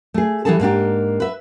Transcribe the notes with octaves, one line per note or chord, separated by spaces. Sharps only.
A3 G#4
E3 F3 G3 G#4 A4 A5
G#2 A#3 D4 G4
B4 E5